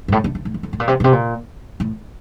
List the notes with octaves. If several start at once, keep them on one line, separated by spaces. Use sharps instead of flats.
G2
A2
D3
D3
A2
E2
F2
A2
A#2
C3
A#2
C3
A#2
A2